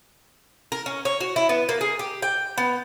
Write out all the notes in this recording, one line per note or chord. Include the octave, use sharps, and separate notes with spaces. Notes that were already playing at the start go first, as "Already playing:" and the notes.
A#4
C#4
C#5
F#4
E4
B3
A#3
G#4
G4
G5
B3